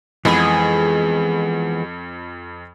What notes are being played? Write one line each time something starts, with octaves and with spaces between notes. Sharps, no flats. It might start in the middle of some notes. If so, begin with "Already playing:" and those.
F2 E3 G#3 B3 G#4 B5